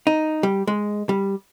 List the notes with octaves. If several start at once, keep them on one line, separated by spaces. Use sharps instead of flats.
D#4
G3
G#3
G3